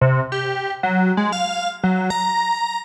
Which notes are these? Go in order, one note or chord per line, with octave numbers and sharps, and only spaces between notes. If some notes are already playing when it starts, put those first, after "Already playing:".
C3
G4
F#3
G#3
F5
F#3
A#5